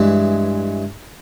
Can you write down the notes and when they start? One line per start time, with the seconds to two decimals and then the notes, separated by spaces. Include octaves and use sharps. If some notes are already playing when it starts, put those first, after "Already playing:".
Already playing: G2 E3 G#3